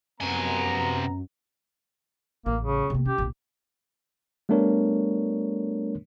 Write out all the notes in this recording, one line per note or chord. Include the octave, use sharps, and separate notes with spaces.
F#2 C3 B3 G#5 A#5
A1 A#3
C#3
C3 A#3
C#4 G4
A#1 C3
G3 A3 B3 D4 A#4 C#5